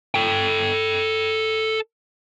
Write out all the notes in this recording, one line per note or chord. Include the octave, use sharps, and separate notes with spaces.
A4 G5